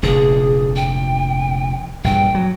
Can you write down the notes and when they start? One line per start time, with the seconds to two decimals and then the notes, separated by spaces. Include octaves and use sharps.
0.03 F1 A#2 D3 G#4
0.76 G5
2.04 A#1 G2 G5
2.35 F#3